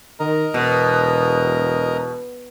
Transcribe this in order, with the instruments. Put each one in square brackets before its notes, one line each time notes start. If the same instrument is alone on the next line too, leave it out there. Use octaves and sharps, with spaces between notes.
[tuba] D#3 [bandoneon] A#4 D#5 A#5
[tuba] E1 [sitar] B2